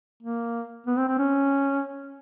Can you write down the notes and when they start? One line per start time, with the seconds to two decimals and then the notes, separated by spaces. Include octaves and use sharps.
0.23 A#3
0.86 B3
0.97 C4
1.08 C4
1.18 C#4